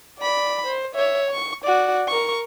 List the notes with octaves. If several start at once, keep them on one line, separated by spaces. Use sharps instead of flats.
D5 B5
C5
C#5 E5
C#6
F#4 D5
A#4 C#6